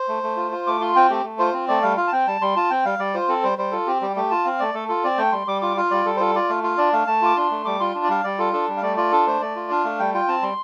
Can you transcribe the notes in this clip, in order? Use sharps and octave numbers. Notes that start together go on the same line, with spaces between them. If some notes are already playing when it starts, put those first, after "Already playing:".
Already playing: C5
A3
A3
F4
F4
A3 D6
F4 C6
C4 G5
A3 G4
A3
F4 C5
C4
A3 D5
G3 F5
F4 F5
A5
C4 G5
G3 A5
G3 C6
F4 A5
C4 G5
G3 F5
G3 D5
F4 C5
C4 A4
G3 C5
G3 C5
F4 A4
C4 G4
G3 G4
A3 G4
F4 A5
C4 F5
A3 D5
A3 A4
F4 A4
C4 D5
A3 G5
G3 C6
G3 D6
F4 D6
F4 F5
G3 D5
G3 A4
C5
F4 A4
F4 D5
A3 F5
F4 F5
D4 D5
A3 F5
A3 A5
F4 D6
D4 C6
A3
G3 D6
F4 C6
D4
D5
G3 F5
G3 D5
F4 A4
D4 A4
G3
F5
A3 D5
F4 D5
D4 A4
A3 C5
A3 D5
F4
D4 F5
A3
G3 G5
F4 G5
C4 A5
G3 C6